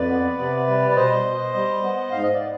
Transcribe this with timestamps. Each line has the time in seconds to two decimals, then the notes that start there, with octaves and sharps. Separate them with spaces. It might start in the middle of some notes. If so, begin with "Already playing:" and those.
Already playing: F2 B4 D5
0.09 B3
0.38 C3
0.67 G3
0.91 D5
0.95 B2 C5 D#5
1.25 B2
1.54 G3
1.83 B3
2.11 G#2 F5
2.22 D#5
2.34 D5
2.40 B3